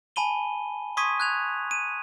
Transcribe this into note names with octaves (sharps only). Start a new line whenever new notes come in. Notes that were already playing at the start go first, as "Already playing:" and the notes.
G#5 A5 B5 D#7 G7
C6 C#6 D#6 G#6 B6 D#7
F#6 G#6 F7
D#7